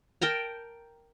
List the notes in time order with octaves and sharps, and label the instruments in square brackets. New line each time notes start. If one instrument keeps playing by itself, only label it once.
[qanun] A#4 G5 A5 A#5